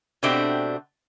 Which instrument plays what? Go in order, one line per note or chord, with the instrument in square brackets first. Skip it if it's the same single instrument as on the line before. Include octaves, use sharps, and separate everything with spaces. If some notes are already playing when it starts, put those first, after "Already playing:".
[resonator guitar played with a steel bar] B2 A3 C4 D4 F#4 G4